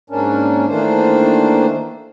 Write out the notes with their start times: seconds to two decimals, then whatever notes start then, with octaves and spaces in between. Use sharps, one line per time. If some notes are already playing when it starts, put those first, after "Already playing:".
0.10 G#2 A#3 C#4 D4
0.68 D#3 E3 A3 A#3 D4 C5